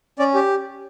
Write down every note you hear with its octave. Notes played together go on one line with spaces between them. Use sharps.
C#4 D5
G4